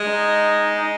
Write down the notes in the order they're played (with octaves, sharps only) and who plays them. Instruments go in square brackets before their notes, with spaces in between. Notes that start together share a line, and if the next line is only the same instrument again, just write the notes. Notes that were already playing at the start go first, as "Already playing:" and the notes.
Already playing: [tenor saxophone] G#3
[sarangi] D#4